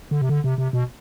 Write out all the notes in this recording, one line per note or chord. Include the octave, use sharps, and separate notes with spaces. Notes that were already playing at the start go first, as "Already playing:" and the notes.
D3
C3
D3
C3
C3
B2